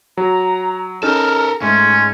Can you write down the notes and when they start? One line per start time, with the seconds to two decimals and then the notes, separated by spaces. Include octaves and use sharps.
0.17 F#3 A#5
1.03 C#4 D#4 A4 A#4 F6
1.61 G#2 A3 C#4 C6